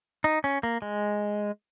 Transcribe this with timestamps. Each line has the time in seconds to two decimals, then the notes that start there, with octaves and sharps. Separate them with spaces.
0.24 D#4
0.44 C#4
0.63 A#3
0.82 G#3